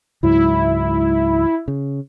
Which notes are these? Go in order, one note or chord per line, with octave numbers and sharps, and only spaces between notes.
C#2 G#2 F#3 E4
C#3